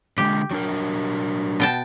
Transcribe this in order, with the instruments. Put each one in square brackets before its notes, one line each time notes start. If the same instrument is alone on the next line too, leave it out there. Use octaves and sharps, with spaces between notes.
[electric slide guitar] D3 F3 G#3 [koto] G4
[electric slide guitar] F#3 D4 A#4
[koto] B2 G5 A5